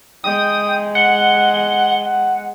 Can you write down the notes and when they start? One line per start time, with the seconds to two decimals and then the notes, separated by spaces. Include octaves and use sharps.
0.24 G#3 G5 D#6
0.95 F#5 G7
2.04 F#5